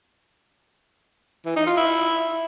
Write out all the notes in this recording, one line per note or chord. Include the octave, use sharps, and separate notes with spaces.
E3
D#4
F4
E4